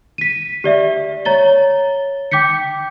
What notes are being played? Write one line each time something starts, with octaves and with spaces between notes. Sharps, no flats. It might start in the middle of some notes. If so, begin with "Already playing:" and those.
B6 D#7
G4 D5 E5
C#5 A#5 A6 G7
G5 D6 G6 B6 C#7